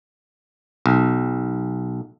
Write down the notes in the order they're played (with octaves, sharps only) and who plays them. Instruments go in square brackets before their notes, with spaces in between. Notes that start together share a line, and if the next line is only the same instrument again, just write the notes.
[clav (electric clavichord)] B1